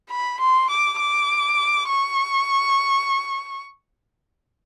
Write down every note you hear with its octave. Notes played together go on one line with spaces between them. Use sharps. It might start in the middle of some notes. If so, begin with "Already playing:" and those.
B5
C6
D6
D6
C#6